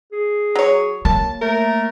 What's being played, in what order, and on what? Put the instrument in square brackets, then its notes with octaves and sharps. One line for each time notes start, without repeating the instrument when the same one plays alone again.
[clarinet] G#4
[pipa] F#3 C#5
[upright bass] A#3 [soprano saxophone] A5
[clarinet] A3 [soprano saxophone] A#4